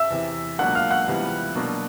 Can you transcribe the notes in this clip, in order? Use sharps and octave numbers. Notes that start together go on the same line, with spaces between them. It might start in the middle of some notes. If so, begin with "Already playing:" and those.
Already playing: E5 E6
E2 C3 E3
C#2 B2 F#3 A#3 D4 F#5 F#6
F5 F6
F#5 F#6
C#2 C3 E3 G3 B3
B2 F#3 A#3 D4